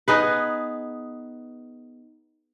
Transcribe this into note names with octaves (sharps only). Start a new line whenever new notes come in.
B3 D#4 G#4 B4